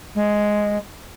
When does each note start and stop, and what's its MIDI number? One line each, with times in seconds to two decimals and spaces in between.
0.15 0.77 56